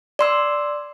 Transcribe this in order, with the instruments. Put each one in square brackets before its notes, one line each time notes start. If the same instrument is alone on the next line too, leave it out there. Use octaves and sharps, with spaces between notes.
[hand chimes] D5 C6 E6